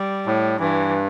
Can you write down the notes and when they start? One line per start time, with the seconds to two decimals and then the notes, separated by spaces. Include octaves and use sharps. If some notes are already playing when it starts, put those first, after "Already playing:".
Already playing: G3
0.26 A2
0.60 G2 E3